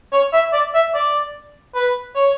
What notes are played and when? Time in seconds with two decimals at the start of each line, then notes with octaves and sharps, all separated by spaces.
0.13 C#5
0.33 E5
0.53 D5
0.75 E5
0.94 D5
1.75 B4
2.16 C#5